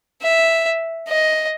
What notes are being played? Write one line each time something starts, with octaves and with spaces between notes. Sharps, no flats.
E5
D#5